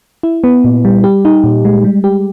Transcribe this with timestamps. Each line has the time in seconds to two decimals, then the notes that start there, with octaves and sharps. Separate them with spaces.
0.23 E4
0.44 B3
0.64 A#2
0.85 G3
1.04 G4
1.25 D#4
1.44 A#2
1.65 G#3
1.84 G3
2.04 G4